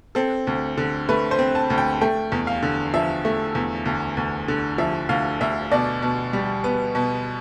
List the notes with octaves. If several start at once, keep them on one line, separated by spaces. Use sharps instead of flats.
C4 A4
D2
D3
A3 B4
C5
C4
A5
D2
G5
A3 G5
E2
F5
D3
F3 E5
A3
E2
D2
D2
D3
F3 E5
D2 F5
D2 E5
B2 D5
B2
G3
B3
B2